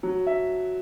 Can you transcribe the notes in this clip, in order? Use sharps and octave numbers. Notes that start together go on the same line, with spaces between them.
F#3
E5